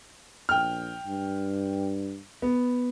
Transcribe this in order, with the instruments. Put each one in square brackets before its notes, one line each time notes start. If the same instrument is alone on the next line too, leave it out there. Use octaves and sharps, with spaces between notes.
[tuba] A#1 [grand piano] G5 F6
[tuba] G2
[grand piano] B3